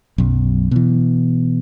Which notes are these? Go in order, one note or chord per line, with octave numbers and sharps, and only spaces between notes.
B1 F#2
B2 E3